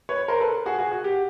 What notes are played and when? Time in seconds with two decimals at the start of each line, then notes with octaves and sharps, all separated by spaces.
0.09 B4 C#5
0.28 A#4 C5
0.40 A4 B4
0.66 F#4 G#4
0.79 F#4 G#4
0.92 F#4
1.04 G4